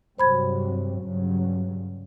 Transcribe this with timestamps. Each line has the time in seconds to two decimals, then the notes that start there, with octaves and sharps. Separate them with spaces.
0.18 G2 C3 F#3 C5 B5 G#6
1.01 G2 C#3 F#3